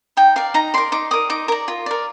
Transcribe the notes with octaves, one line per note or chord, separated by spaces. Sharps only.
D#4 G5
A#4 D5 F5
D#4 A#5
A#4 D5 C6
D#4 D6
A#4 D5 D#6
D#4 D6
A#4 D5 A#5
F4
A#4 D5